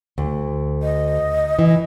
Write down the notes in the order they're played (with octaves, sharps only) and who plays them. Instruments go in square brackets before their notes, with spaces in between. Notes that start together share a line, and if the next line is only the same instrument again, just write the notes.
[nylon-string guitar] D2
[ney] D#5
[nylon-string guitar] E3